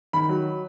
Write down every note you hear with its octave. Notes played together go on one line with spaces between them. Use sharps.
D#3 B5
F#3